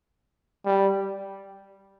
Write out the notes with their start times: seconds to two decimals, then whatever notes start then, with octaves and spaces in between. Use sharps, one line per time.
0.66 G3